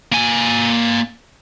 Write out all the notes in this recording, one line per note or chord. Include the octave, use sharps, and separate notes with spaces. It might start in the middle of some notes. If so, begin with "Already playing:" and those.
A#3 G#5